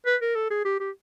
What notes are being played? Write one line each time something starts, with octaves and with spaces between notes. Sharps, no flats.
B4
A#4
A4
G#4
G4
G4